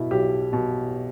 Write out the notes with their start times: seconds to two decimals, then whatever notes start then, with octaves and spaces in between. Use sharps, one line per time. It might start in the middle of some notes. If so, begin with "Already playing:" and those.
Already playing: B2 E4
0.11 B1 G4
0.53 B2